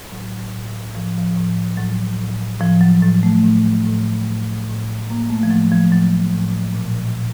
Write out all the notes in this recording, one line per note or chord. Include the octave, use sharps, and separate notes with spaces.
A2 F#3
A2
A2 F3
F3
A2
A2 F#3
A2
A2 F3
F#3
A2 F#3
A3
A2
A2
A2
A2
A2 A#3
A3
F3
A2 F#3
F3
A2 F#3
A2
A#2
A#2